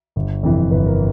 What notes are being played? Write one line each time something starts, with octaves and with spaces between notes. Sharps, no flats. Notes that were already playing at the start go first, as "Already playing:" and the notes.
G1
F2 C3 E3
G1 B4
A#4